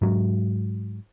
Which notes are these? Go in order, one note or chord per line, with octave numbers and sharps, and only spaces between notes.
G#2 F#3